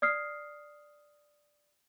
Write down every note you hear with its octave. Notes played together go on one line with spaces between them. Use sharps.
D5 D#6 F6 C7